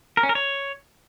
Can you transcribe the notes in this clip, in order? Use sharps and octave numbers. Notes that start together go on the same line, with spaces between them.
A#4
C#4
A#4
C#5